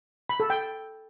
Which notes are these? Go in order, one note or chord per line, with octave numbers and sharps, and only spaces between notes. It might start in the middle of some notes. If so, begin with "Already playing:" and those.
B5
A4
G5